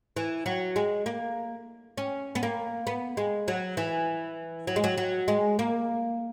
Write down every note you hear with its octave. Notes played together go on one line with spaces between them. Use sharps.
E3
F#3
G#3
A#3
C#4
B3
A#3
B3
G#3
F#3
E3
F#3
G#3
F#3
F#3
G#3
A#3